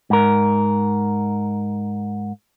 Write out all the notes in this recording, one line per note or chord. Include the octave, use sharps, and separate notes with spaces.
G#2 A#4